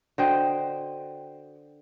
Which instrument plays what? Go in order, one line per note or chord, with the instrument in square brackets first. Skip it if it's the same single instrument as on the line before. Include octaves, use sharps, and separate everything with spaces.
[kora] D3 C5 D#5 [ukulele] F#4 G5